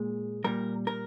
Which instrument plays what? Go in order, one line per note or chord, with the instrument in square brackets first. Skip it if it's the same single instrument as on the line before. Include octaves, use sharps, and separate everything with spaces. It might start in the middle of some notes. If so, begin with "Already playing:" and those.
Already playing: [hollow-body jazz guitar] A#2 G#3
A#2 G3 A#4
A#4